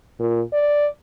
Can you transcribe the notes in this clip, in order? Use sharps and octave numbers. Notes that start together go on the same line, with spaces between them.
A#2
D5